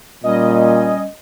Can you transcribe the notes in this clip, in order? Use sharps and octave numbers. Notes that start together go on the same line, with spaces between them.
A#2 G3 C#4 D#5